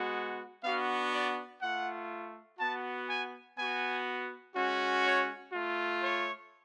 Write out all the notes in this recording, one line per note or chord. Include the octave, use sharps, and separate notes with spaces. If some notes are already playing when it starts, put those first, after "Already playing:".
Already playing: G#3 B3 F#4
B3 D4 F#4 F5
D5
A3 F4 F#5
B3 F#4 A5
G#5
B3 F#4 G#5
G#3 C#4 F#4
C#5
A3 F4
C#5